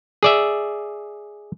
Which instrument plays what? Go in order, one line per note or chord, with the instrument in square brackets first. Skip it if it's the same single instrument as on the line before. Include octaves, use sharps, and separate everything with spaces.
[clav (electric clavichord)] G#4 D5 E5